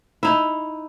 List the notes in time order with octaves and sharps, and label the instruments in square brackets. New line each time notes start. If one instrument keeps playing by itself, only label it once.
[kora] D#4 E4